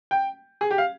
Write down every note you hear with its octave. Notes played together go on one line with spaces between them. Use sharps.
G5
G#4
G4
F5